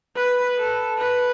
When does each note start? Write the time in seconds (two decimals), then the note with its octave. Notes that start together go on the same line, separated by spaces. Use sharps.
0.16 B4
0.58 A4
0.99 B4